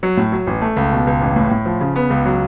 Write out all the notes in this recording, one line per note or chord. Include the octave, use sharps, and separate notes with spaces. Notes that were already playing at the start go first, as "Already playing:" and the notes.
F#3
A2
F#3
A1
A3
C#2
B2
C#2
A1
A2
A2
F3
C#3
B3
C#2
F#3